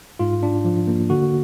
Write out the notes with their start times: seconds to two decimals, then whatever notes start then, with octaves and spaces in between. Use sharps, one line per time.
0.19 G#2 F4
0.43 D4
0.65 F3
0.87 A#3
1.10 D3 F#4